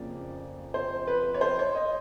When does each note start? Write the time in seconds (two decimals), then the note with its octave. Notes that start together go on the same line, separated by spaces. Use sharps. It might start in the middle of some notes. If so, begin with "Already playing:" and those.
Already playing: F2 C#3 F3 A#3 D5
0.74 C5
1.07 B4
1.34 C#5
1.41 C5
1.59 C#5
1.75 D#5